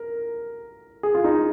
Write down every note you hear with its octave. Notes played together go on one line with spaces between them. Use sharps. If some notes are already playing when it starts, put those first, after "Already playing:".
Already playing: A#4
G#4
F4
D#4